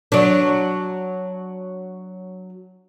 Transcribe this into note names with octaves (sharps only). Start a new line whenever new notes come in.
F#3 D4